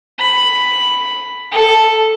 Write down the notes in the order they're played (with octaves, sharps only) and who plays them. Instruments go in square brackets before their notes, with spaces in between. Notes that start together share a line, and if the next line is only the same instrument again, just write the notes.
[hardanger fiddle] B5
A4